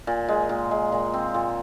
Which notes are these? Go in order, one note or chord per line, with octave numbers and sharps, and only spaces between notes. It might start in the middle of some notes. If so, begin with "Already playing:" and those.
A#2
G#3
A#2
G#3
A#2
C4
A#2